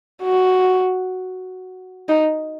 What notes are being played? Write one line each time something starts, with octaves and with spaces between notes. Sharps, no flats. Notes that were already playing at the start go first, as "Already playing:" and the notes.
F#4
D#4